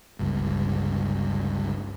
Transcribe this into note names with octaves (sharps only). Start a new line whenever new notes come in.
G1 C#2 G2